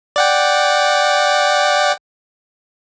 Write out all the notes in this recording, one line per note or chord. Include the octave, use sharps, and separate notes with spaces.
D5 F#5 G5